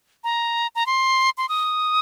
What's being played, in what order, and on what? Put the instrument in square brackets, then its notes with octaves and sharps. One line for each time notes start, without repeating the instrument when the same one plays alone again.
[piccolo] A#5
A#5
C6
C6
D#6